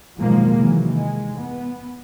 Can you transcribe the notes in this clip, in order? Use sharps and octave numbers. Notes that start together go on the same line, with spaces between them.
B2 D#3 F3 F#3 G#3 A#3
C3 D#3 E3 F#3
G#3
B3